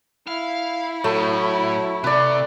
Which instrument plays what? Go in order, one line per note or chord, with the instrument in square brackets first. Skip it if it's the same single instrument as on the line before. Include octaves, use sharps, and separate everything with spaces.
[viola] E4 [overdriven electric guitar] F5
[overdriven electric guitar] A2 [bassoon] F#3 [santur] A3
[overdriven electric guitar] C3 [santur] B4 D5